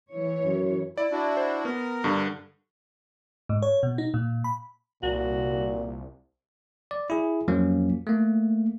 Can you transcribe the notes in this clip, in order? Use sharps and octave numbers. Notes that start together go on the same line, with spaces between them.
E3 C#5
F#2
E4 D5
D4 E4 F#4
C5
B3 A#4
G2 D3
G#2
C#5
B2
D#4
A#2
B5
C2 A#2 F#4
D5
E4 G#4
F2 F3 F#3 A#3 C#4
A3 A#3